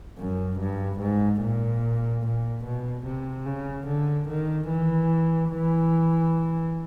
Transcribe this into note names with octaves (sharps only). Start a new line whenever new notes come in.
F#2
G2
G#2
A#2
A#2
B2
C3
C#3
D3
D#3
E3
E3